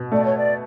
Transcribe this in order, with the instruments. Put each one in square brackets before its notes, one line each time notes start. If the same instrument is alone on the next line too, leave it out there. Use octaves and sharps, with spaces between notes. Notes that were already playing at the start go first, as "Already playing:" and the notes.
Already playing: [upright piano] B2
[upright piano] A3 [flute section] D5
[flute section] C#5
D5